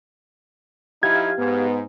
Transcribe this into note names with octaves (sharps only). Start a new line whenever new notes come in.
F3 D#4 E4 G4 F5 G#6
G#2 B3